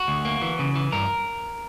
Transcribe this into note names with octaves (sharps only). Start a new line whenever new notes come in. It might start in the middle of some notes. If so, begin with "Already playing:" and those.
Already playing: F#4
D2
A#3
E3
C#3
E3
G2 A#4